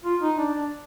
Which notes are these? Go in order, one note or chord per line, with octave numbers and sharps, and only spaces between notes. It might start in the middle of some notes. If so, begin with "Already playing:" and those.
F4
D#4
D4
D4